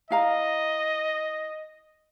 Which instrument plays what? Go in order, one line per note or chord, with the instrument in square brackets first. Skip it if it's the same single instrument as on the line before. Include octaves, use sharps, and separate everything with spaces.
[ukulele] E4 F5 A#5 [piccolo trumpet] D#5